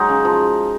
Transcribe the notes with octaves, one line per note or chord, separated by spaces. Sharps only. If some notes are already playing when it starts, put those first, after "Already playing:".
Already playing: F#3 G#3 D#4
C#3
F3